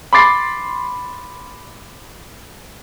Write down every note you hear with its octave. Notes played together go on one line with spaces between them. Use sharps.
B5 C6 D6 A6 C7